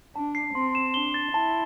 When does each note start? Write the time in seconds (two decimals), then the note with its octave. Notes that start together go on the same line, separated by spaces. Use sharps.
0.15 D4 A5
0.35 C7
0.54 C4 C6
0.75 E7
0.94 D4 G7
1.14 A6
1.34 E4 A5